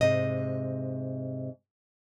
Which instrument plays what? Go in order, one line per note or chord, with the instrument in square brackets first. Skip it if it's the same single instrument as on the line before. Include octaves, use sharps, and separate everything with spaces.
[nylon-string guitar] G#2 C3 D#5